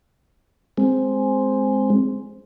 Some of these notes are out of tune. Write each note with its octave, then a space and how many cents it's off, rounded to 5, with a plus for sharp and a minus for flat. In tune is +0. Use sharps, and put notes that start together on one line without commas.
G#3 +0 C4 +0